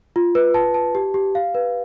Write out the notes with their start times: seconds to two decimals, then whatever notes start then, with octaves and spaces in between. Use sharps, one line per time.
0.16 F4
0.35 B4
0.54 A5
0.74 A5
0.95 G4
1.14 G4
1.35 F5
1.54 B4